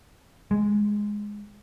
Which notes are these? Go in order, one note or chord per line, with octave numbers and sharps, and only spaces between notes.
G#3